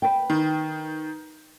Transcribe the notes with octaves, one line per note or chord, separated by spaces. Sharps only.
B4 G5
D#3